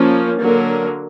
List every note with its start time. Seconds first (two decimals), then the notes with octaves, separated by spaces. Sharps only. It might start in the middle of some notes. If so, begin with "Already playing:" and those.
Already playing: F3 A#3 C#4
0.41 D3 F#3 A#3 A#4